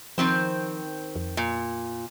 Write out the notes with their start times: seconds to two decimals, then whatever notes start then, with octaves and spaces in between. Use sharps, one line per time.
0.18 D#3 F3 C4 C5
1.16 F2
1.37 A#2